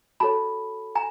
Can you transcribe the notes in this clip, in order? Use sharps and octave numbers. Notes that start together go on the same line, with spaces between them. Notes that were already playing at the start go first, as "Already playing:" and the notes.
F#4 A4 C#5 A5 B5
G#5 A#5